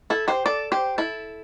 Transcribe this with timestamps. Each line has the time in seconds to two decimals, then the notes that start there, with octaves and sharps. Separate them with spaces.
0.10 E4 A4
0.28 G4 C5
0.46 A4 D5
0.72 G4 C5
0.98 E4 A4